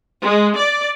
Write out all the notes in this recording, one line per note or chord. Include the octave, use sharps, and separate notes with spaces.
G#3
D5